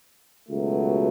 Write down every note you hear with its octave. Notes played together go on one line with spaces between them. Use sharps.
C#2 B2 F#3 A3